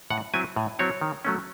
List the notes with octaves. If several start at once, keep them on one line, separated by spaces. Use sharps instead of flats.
A2 F#5
F#3 C4 E4 G#5
A2
F#3 C4 E4 C#5
D#3
F#3 A3 C#4